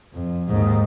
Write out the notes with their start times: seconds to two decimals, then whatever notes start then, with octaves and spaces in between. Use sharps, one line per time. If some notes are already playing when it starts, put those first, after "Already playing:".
0.14 F2
0.48 D#2 G#2